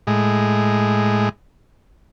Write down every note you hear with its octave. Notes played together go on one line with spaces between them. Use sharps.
A2 G#3